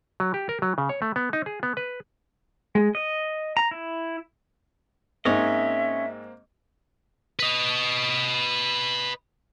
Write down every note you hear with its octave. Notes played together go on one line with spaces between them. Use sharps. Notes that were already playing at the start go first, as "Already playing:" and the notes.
F#3
G4
A#4
F#3
C#3
C#5
A3
B3
D#4
G#4
B3
B4
G#3
D#5
A#5
E4
G#2 A#3 C4 C#4 C#5 D#5 E5
B4 D#5